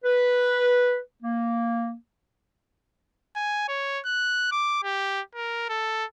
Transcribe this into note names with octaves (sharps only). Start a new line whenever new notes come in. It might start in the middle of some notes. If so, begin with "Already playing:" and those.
B4
A#3
G#5
C#5
F#6
D6
G4
A#4
A4